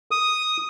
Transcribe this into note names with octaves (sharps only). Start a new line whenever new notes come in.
D#6